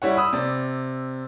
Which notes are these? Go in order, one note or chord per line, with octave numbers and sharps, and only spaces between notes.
G3 E4 C#5 F#5
B5 D#6 E6
C3 D5